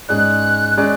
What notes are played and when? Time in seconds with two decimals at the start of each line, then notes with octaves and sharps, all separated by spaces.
0.09 G#2 G#3 C#4 G#4 D5 F#6
0.78 G#3 C#4 G#4 D5